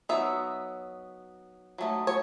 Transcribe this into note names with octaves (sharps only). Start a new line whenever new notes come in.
F#3 B3 D#4 E5
F#3 A3 D#4
C#5